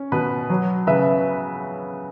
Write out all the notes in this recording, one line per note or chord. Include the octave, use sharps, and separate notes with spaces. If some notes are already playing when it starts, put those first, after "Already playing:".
Already playing: C#4
B2 B4
F#3
C#3 B4 E5